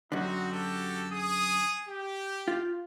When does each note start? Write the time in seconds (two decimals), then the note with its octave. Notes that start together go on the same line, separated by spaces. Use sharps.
0.12 F#2 D3 C4 D#4 F#4
0.52 F#4 G4 A4
1.12 G#4 D#6
1.88 G4
2.48 F4